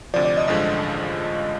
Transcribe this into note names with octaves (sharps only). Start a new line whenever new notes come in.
D2 C3 F3 D5
D5
D#5
A1 G2 D3 F3 G#3 D#5